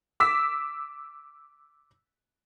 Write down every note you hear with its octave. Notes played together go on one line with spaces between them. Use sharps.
D6 E6 B6